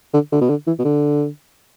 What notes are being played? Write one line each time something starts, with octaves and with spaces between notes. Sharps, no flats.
D3
D3
B2
D3
E3
B2
D3